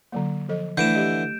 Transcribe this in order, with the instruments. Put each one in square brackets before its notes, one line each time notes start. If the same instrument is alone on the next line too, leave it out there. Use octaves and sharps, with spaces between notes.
[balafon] D3 F#3 A#3
F3 A4 D#5
[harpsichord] D3 E3 E4 [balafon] A3 A4 [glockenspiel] G6 D7 E7
[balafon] G4 D#5